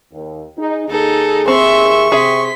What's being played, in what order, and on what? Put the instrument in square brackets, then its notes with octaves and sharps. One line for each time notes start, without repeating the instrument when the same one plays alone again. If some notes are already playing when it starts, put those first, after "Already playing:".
[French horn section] D#2
D#4 G#4
[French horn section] D#2 G#4 [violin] D#4 A4
[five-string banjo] C4 [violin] E5 C6 [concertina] C#6
[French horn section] C3 [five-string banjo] G#4 E5 [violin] C6 B6